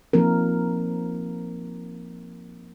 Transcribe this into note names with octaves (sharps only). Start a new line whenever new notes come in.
F3 A#3 C4 D#4 A#4